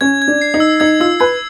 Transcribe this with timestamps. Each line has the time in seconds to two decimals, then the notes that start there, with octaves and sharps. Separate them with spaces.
0.01 C#4 G#6
0.22 G#6
0.28 D4
0.41 C7
0.54 D#4
0.60 E6
0.80 D#4 G#6
1.00 F4 E6
1.20 B4 G#6